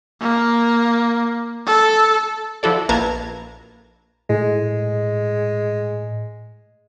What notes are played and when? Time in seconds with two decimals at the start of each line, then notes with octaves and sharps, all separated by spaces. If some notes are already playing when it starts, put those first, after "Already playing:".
0.21 A#3
1.67 A4
2.63 F3 E4 F#4 A4 D5
2.89 A#1 A#3 B4 A5 A#5 G#6
4.30 A2 G#3